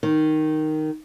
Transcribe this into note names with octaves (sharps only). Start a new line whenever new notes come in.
D#3